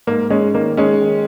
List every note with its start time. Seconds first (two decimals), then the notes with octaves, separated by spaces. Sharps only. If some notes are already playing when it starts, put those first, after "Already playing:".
0.07 G#2 A#3
0.30 G#3 C#4
0.55 D#3 A#3
0.77 G#3 C#4
1.01 D#3